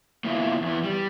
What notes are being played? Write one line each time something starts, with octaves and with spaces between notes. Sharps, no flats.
A#3 B3 E4 F4
E2 B3
G3